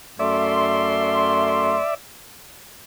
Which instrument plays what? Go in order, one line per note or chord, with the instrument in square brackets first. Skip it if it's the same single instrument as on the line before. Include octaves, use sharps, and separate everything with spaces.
[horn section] F#2 A3 C6 [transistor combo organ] D5 E5